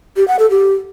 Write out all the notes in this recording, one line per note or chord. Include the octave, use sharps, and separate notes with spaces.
G4
F#5
A4
G4